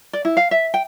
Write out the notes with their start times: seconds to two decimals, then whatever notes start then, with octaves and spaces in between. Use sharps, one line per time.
0.13 D5
0.25 E4
0.37 F5
0.51 E5
0.74 G5